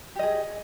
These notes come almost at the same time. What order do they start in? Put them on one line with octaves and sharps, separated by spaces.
G4 D#5 G#4